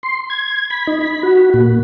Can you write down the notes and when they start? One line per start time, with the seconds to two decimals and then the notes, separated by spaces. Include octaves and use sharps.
0.03 C6
0.30 G#6
0.70 B5
0.87 D#4
1.01 B5
1.23 F#4
1.54 A#2